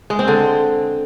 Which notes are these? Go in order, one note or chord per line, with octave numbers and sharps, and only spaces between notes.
G#3
C4
D3